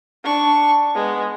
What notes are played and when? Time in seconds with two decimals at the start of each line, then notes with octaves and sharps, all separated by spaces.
0.24 D4 C#6
0.94 G#3 B3